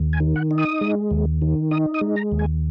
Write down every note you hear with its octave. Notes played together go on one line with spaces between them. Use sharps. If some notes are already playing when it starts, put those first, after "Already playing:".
Already playing: D#2
G#5
D#3
F#5
D#4
D#6
G#3
D#2
D#3
D#4 D#6
D#6
G#3
A#5
D#2
G#5